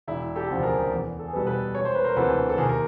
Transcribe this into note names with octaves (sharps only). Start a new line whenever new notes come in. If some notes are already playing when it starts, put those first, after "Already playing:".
E1 E4
G4 A4
D2 C#3 F3
G#4 A#4
E2
A4
G#4
B2 G3 B3 G4 A4
A4 B4
E1 C#5
C5
B4
A#4 C5
D2 C3 E3 A4 B4
A4
D#2 G#4 A#4
A#4